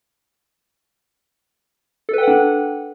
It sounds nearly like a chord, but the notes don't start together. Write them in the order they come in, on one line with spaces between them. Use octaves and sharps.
A4 B4 G5 F#5 D4